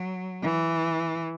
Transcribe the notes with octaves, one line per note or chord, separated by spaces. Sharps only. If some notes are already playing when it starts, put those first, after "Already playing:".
Already playing: F#3
E3